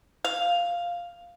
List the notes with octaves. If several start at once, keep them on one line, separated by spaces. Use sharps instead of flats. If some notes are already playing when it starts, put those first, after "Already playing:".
F5